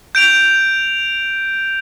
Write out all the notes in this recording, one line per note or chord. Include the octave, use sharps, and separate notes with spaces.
G6 D7 F7